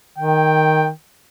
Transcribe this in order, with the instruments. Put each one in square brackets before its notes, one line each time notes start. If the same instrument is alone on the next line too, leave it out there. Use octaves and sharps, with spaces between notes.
[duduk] D#3 [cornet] G5